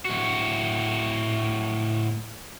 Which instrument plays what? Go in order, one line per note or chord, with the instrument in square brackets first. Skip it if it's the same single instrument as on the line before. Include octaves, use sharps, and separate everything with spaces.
[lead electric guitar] A2 F#4